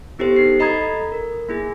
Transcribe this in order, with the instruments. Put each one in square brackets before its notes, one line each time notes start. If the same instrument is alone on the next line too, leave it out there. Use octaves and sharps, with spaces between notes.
[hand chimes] B3 E4 G4 A4 C5
D#4 C7
A4 D#5 A#5 B5 D#6 G#6
A#4
A#3 E4 G#4